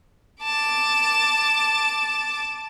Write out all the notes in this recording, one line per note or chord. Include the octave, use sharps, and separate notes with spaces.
A5 D6